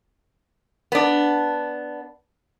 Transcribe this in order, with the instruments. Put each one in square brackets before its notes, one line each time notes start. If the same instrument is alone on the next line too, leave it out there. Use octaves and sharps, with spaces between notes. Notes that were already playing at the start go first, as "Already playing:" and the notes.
[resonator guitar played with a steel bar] B3 D4